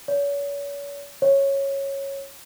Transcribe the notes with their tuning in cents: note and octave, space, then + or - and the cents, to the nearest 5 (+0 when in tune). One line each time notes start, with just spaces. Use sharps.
C#5 +40
C#5 -10